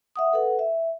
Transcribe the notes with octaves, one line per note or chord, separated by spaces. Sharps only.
E5 F#5 D#6
A4 B4 F#5
E5